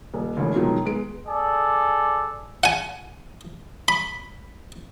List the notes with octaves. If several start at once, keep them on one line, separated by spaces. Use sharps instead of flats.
D#1
E1 A1 D2
B2 D#3 F3 F#3 G#3
G#3 B3 D7
G#4 A4 D5
F#5 G#5
B5